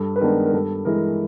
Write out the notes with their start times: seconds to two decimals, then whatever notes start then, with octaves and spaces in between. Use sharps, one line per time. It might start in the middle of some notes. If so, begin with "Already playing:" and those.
Already playing: G2 A4
0.16 B4
0.20 D#3 G#3 B3 D4 A#4
0.45 A#4
0.53 G2 A4
0.85 E3 G#3 A#4